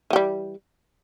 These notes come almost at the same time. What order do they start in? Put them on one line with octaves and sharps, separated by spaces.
E3 G4 G3